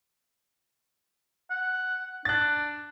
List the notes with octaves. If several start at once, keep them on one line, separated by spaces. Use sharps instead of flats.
F#5
D4 F#6 A6